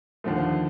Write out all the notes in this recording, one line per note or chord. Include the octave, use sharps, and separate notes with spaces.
D#2 D3 F3 A3